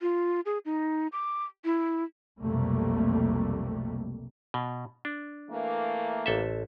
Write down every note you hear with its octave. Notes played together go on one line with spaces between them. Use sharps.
F4
G#4
D#4
D6
E4
B1 F2 C3 G3 A3 A#3
B2
D4
E3 A3 A#3
A1 A4 E5